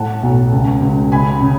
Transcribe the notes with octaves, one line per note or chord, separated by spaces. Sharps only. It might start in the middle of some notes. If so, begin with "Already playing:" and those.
Already playing: A2 F#5 A5
B1
C#2
C#2
C#3 G#5 B5
C#3